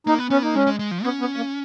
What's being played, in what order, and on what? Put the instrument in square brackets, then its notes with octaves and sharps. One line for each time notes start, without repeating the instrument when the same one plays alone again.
[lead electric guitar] A#3 [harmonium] D#4
[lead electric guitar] B3
[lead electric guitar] B3 [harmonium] C#4
[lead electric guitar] A#3 [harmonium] D#4
[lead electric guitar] G#3 [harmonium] C#4
[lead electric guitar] G#3
G#3
F3
[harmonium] B3 [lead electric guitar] C#4
[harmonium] B3
A#3